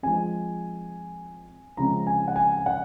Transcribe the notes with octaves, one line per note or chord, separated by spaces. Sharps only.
F3 G#3 C4 G#5
C#3 F3 G#3 C4 A#5
G#5
F#5
G#5
G#5
F#5